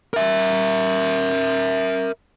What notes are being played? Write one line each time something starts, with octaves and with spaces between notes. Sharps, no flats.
A#4 E5